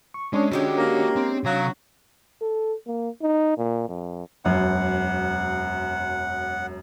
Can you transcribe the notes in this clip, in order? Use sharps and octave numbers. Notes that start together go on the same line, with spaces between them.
C#6
G#3 C#4 D4 C#5
G3 G#3 F#4 G4 D5
A#3
C4
C3 F#3 F5
A4
A#3
D#4
A#2
F2
E1 F#2 F#5